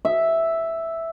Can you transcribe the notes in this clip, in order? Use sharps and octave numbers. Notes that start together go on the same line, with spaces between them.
E5